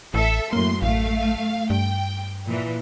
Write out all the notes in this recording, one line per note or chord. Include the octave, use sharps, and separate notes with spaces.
A1 A4 E5
F#2 A2 A#3 C6
A1 A3 F5
G2 G5
A#2 E3